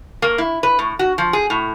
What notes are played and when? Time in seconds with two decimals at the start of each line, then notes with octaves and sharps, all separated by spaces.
0.22 A#3
0.38 E4
0.63 B4
0.79 A2
0.99 F#4
1.18 F3
1.33 G#4
1.50 A2